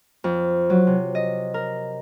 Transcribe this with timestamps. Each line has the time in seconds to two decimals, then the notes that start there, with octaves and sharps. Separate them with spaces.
0.24 F2
0.70 F#3
0.87 C3
1.15 D#5
1.54 A#4